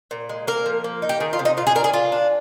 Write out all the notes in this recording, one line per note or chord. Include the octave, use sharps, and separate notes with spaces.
A#2
G#3
A#3 A#4
F3
A#3
D#4
G4
D#3 G#4
F4
C3
D#4
A#2 F4
G#4
D4 A#4
G#4
D4 F4
D4